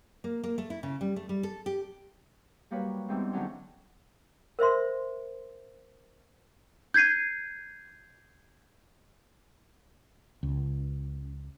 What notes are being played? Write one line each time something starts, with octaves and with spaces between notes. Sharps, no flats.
A#3
A#3
A3
E4
C#3
G3
A3
G3
A4
G4
F#3 G3 A#3 F#4 B4 C#5
G#2 E3 G3 G#3 B3 C4
G#2 D3 F#3 C#4 G6
A#4 C5 E5 C6
G6 G#6 C7 D#7
C#2